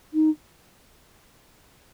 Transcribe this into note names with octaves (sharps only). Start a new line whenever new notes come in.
D#4